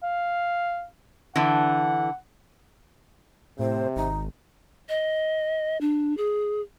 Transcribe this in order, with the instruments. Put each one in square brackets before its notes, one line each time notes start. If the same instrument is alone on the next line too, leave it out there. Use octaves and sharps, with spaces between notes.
[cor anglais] F5
[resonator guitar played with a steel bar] D3 E3 [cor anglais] F#5
[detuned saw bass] A2 [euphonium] C3 [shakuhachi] C5
[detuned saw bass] G#1 [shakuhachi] D#4
[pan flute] D#5
D4
G#4